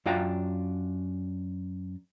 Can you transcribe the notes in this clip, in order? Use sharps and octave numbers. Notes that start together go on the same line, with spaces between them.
F#2 D4 F4 G5 A5 A#5